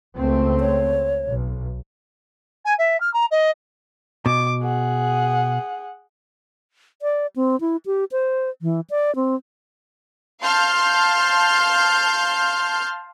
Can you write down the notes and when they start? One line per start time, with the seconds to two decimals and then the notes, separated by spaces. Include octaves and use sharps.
0.17 C#2 A3 C4
0.60 C#5
1.27 B1
2.65 G#5
2.78 E5
3.00 F6
3.13 A#5
3.31 D#5
4.26 B2 D6
4.63 G#4 F#5
7.02 D5
7.36 C4
7.61 E4
7.86 G4
8.12 C5
8.62 E3
8.90 D5
9.16 C4
10.41 F5 A5 C6 F6 G6